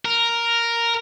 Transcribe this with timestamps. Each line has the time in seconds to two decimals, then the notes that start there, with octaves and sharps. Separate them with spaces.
0.05 A#4